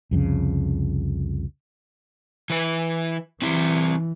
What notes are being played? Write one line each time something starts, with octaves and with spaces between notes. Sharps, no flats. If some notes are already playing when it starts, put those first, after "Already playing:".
C2 F2 C#3
E3 B4
E3 C4 E4